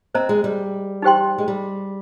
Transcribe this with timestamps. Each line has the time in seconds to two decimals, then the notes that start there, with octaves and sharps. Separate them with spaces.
0.15 C4 C5 D#5 A#5
0.29 G#3
0.44 G3
1.02 D#4 G4 C5 G5 C6
1.38 G#3
1.48 G3